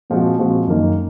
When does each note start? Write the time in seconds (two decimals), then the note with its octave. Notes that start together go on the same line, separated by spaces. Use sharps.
0.10 A#2 F3 G#3 C4 F#4
0.39 A#2 F3 G#3 C4 F#4
0.67 F#2 D#3 A#3 D#4